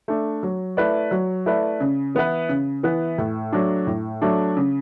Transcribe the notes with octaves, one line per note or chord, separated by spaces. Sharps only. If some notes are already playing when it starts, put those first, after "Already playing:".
A3 D4
F#3
A3 E4 B4 D5
F#3
A3 E4 B4 D5
C#3
E3 B3 E4 B4
C#3
E3 B3 E4 B4
A2
F#3 A3 D4
A2
F#3 A3 D4
C#3